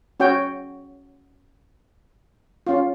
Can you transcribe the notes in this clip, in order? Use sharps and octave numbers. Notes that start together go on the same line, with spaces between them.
C#4 F#4 C#5 G5
C#4 F4